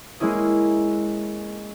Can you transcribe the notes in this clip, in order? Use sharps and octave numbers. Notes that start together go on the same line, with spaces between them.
G#3 A#3 C#4 E4 D#5